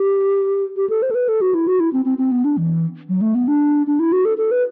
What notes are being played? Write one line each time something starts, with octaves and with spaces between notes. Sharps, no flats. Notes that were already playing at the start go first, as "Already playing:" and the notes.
Already playing: G4
G4
A4
C5
A4
B4
A4
F#4
E4
F#4
E4
C4
C4
C4
B3
D4
E3
F#3
A3
B3
D4
D4
E4
F#4
A4
A4
B4